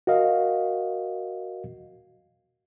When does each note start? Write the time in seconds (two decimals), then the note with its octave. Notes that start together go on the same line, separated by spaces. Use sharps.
0.07 F#4 A#4 D#5 F5